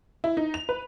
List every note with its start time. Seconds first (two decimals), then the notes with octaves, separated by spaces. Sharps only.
0.24 E4
0.37 D#4
0.54 F7
0.69 B4